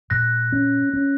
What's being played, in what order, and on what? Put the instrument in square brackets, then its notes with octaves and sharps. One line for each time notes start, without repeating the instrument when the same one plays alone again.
[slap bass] A#2 [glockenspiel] F#6 A#6
[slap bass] C#4
C#4